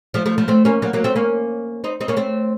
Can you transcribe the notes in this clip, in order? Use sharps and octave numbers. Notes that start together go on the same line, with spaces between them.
F3 A3
F3 A3
F3 A3
A3 C4
A#3 C#4
F#3 A#3
F#3 A#3
A3 C4
A#3 C#4
C4 D#4
C4 D#4
A#3 C#4
A3 C4